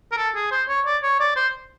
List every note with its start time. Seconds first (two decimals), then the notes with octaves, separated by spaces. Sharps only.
0.12 A#4
0.17 A4
0.35 G#4
0.51 C5
0.69 C#5
0.86 D5
1.03 C#5
1.20 D5
1.36 C5